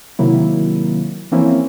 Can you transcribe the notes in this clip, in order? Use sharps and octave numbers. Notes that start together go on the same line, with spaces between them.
C3 D#3 F#3 A#3 E4
E3 F3 A#3 C4 C#4 E4